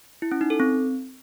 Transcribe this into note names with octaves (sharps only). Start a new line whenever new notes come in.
E4
C#4
D#4
A4
C4